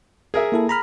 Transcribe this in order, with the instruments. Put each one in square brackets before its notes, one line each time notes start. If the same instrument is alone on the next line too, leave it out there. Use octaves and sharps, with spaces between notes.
[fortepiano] G#4 A#4 E5
[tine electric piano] A#3 E4 A4
A#5 B5 F6